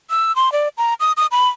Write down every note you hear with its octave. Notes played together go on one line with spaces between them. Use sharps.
E6
C6
D5
A#5
D#6
D#6
B5